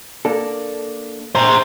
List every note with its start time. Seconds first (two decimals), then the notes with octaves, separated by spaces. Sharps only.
0.25 A#3 D4 A4
1.35 C5 A#5